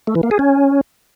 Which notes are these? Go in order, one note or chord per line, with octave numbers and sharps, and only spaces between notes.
A3
E3
A#3
G#4
C#4